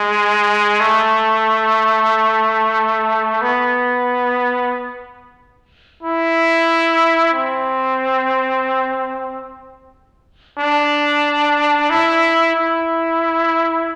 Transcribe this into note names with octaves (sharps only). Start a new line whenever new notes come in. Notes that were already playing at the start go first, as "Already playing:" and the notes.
Already playing: G#3
A3
B3
E4
C4
D4
E4
E4